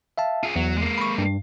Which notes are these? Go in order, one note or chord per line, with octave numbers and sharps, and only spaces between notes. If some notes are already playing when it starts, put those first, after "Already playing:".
E5 F5 A5
F4 G#4
E2 F#3
G#3 A#3
B5 C#6
G2